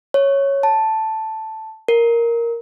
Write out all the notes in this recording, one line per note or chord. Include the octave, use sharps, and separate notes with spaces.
C#5
A5
A#4